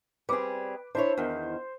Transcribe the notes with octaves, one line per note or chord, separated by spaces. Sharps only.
G3 C4 G#4 B4 D6
D4 E4 C5 C#5
E2 D#3